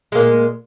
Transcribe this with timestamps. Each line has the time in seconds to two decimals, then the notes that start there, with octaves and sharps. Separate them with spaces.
0.12 G#3
0.15 A#3
0.18 A#2